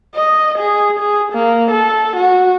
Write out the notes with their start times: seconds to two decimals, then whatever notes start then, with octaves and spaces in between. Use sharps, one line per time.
0.15 D#5
0.58 G#4
0.99 G#4
1.32 A#3
1.71 A4
2.16 F#4